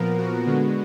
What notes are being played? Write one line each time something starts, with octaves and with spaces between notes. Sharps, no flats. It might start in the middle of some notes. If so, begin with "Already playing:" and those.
Already playing: A#2 F3 B3 A#4
F#4
D3 G#3 B3